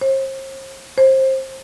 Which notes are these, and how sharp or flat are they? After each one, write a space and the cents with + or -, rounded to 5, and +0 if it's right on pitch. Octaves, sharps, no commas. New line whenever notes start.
C5 +40
C5 +20